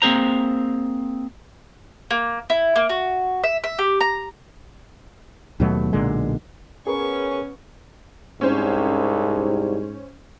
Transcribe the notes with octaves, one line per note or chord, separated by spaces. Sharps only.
A#3 C4 G#4 C5 A#5
A#3
E4
A#3
F#4
E5
E5
G4
A#5
D#2 B2 F#3 A3
B1 A#2 D3 G#3
B3 C#4 G#4 A#4 B4 C#6
C2 G#2 C#4 C5